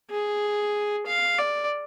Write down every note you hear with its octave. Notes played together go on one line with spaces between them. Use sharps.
G#4
F5
D5